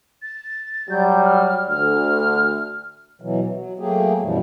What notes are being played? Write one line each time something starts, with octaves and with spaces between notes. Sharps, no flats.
A6
F#3 G3 G6
F6
D2 F6
B2 E3 F#3
F#3
F#3 A3 A#3 G4 G#4
F#2 B2 E3 F3 G3